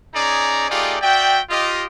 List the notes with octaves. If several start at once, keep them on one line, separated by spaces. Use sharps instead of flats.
C#4 D#4 G#4 D5 A#5
A3 D#4 F4 G4 G#4 D5
F#4 D5 E5 G5
F4 G4 D#5